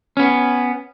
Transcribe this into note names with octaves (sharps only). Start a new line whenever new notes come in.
B3 C#4